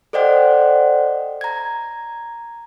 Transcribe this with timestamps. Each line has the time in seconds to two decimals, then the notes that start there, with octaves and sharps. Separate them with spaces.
0.13 A4 C5 D5 D#5 F#5 G5
1.41 A#5 G#6